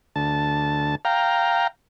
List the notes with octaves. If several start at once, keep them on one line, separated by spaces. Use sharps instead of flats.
D2 A5
F5 G5 A#5